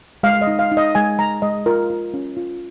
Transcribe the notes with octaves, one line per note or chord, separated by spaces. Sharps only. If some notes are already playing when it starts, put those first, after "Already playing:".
G#3 F5
D#5
D#4
F5
D#4
D#5
G#3 G#5
G#3 A#5
G#3 D#5
F4 A#4
F4
C#4
F4